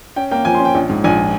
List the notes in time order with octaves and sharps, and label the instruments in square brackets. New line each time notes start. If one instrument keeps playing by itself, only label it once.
[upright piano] C#4 G5
A#3 G5
F3 G#5
C6
C#4
G5
A#1
G#2
A#1 G#5